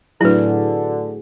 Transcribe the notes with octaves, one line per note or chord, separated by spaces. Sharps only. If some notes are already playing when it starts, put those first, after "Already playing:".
A2 D3 F#3 D4 E4 F#4 G#4 B4